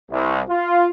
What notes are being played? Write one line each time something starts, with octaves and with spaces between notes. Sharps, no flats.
C2
F4